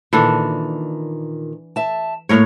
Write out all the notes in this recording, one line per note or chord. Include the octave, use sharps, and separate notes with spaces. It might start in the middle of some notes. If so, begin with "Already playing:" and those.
A#2 D#3 E3 D4 A4
E5 A5
A2 A3 A#3 A#4 C#5